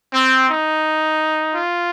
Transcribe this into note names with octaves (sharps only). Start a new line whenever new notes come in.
C4
D#4
F4